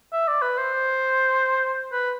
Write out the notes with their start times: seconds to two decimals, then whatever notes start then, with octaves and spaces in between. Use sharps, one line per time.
0.12 E5
0.28 D5
0.42 B4
0.57 C5
1.92 B4